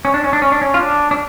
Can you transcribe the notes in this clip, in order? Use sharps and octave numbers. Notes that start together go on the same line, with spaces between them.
C#4
D4
C#4
D4
C#4
D4
C#4
F4
D4
D4